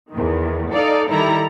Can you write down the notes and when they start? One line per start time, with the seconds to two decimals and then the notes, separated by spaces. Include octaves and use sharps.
0.10 E2 D#3
0.71 D#4 A4 D5 F5
1.08 D#3 G3 E4 A4 A#5